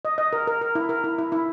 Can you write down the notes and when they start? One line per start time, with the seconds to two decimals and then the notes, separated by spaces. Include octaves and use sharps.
0.05 D#5
0.18 D#5
0.33 A#4
0.47 A#4
0.61 A#4
0.75 E4
0.89 A#4
1.04 E4
1.18 E4
1.32 E4